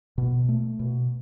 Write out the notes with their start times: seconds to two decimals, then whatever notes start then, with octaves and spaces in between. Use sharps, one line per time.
0.18 B2
0.49 A3
0.79 B2